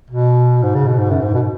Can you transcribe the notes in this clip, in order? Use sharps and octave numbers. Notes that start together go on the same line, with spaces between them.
B2
G#2
C#3
B2
G#2
F#2
G#2
B2